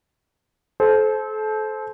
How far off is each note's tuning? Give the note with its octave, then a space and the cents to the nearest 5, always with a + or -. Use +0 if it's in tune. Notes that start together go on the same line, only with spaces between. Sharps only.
A4 -30 C5 +0